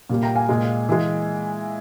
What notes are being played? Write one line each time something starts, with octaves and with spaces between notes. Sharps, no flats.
A#2 G3 A#3
G5 A#5
F5 G#5
A#2 G#3
E3 G#3